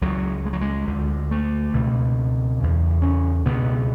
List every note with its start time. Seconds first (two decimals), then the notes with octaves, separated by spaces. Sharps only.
0.01 C#2 C#3 F#3
0.45 G#3
0.53 F#3
0.61 G#3
0.87 D2 D3
1.31 A3
1.73 C#2 B2
2.60 E2 C#3
3.02 C#4
3.45 C#2 B2 B3